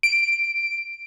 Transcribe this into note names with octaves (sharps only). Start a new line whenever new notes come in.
D7